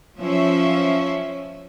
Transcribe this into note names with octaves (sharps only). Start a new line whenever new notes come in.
F3 C#4 E5